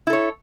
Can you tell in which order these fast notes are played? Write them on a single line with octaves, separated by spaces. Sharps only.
E4 A4 C#5